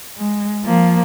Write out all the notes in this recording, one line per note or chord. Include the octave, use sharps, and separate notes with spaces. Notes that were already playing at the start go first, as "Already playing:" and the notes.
G#3
F3 A#3